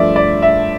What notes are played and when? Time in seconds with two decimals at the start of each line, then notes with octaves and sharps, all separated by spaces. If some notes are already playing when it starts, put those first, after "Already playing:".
Already playing: G2 F3 A3 D5 E5
0.16 D5
0.42 E5